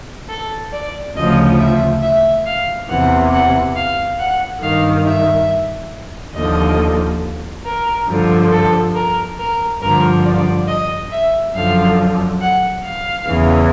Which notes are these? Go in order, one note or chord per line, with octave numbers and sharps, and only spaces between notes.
A4
D5
D2 C#3 F3 D#5
E5
E5
F5
E2 C3 E3 F#5
F#5
F5
F#5
G2 D#3 F5
E5
D#2 D3 F3 D#5
A#4
G2 D3 F3
A4
A#4
A#4
G2 D3 F3 A#4
D5
D#5
E5
F#2 D3 F3 F5
F#5
F5
E2 C#3 E3